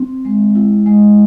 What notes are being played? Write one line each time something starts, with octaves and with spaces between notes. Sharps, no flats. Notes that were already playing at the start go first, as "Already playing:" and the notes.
Already playing: C4
G#3
E4
G#3